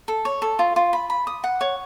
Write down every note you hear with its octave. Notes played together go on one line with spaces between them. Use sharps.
A4
C#5
A4
F4
F4
B5
B5
D#6
F#5
C#5